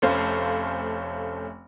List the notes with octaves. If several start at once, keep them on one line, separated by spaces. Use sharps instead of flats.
F1 A3 C#4 C5 F5